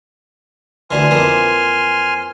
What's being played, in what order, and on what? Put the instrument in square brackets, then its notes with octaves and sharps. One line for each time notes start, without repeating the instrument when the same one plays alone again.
[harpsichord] D2 D3 E3 [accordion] G#5 C6 F6
[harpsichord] F2 E3 A#3